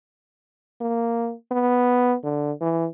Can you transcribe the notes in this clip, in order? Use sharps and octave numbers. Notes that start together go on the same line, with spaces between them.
A#3
B3
D3
E3